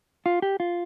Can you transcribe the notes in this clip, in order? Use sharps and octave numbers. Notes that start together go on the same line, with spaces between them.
F4
G4
F4